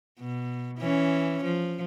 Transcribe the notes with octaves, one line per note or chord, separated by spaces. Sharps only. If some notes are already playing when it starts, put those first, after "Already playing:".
B2
E3 C#4
F3